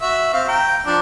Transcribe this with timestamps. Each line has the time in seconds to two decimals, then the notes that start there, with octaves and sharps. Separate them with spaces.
0.02 F#4 E5
0.33 C4 F5
0.48 G5 A#5
0.86 F3 D4